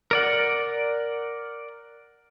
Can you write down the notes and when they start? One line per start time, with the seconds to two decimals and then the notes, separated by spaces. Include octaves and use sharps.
0.11 A#4 D5 F#5